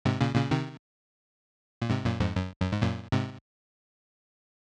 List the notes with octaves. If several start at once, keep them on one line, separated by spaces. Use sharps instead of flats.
G#2 C3
A#2 C#3
A#2 C#3
C3 D#3
A#2
G#2 C3
F#2 A#2
F2 G#2
F#2
F#2
G#2
F#2 A#2
G#2 C3